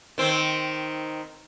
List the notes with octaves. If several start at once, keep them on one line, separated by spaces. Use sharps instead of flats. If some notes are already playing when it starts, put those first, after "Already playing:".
D#3 C4